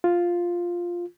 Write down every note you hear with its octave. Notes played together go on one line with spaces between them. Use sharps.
F4